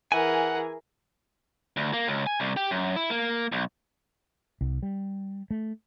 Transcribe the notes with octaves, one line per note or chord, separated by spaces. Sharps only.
E3 G#4 A#4 F#5 G#5
D2
A#3
C#2
G#5
C2
G4
F#2
E4
A#3
B1
C2
G3
A3